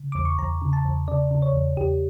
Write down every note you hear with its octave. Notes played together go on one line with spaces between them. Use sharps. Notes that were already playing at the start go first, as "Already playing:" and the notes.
Already playing: C#3
E2 D6
C#6
E2 A#5
C#3
A5
E2
C#3 D5
C#3
C#5
E2
E2 G4